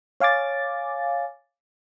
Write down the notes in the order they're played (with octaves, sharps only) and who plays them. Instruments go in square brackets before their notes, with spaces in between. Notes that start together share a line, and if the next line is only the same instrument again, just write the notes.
[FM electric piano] C#5 F5 G#5 D6 A6